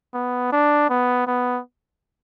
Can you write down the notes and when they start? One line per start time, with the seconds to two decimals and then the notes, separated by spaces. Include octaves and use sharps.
0.14 B3
0.52 D4
0.90 B3
1.27 B3